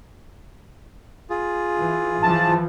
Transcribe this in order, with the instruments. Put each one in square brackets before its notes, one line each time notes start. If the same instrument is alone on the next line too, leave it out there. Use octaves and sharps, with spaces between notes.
[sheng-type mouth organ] F4 G#4
[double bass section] E3
[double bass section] E3 F3 [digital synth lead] A5